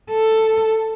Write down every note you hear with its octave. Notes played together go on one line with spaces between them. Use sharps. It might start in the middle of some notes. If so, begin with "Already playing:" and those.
A4